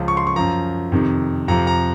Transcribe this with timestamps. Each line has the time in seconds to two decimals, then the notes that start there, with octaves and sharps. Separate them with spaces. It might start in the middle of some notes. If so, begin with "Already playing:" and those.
Already playing: C#2 C#3 F3
0.08 C#6
0.17 C6
0.27 C#6
0.36 F#2 F3 A#5
0.92 F2 C3 D#3
1.48 F2 C3 F3 A#5
1.67 A#5